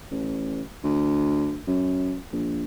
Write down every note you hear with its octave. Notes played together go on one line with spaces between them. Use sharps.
A1
D2
F#2
A#1